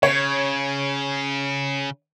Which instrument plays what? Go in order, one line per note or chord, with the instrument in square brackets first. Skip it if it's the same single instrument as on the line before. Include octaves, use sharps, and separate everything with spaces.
[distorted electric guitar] C#3 [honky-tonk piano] C#5